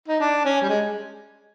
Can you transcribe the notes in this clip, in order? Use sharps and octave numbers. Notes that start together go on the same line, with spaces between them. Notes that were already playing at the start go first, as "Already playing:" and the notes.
D#4
D4
C#4
G3
G#3